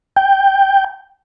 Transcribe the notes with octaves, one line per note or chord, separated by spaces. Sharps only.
G5